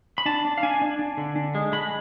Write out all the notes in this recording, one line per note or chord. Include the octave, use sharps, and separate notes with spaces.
B5
D4 A5
D4
F5
D4 G#5
D4
D4
D3
D4
G#3
G#3 B5